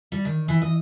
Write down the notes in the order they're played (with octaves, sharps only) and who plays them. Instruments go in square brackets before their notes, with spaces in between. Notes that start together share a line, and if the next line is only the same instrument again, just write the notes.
[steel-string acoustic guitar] G3
D#3
E3
D#5